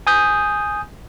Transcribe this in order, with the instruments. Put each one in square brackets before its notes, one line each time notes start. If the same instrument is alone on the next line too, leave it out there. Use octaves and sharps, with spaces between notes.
[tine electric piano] G#5 D#6 G6